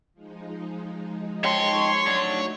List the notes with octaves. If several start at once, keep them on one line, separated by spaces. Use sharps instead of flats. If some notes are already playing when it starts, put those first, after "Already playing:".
F3 G#3 D#4
C#5 D#5 G5 A5 C6
F#3 A3 D4 D#4 F#4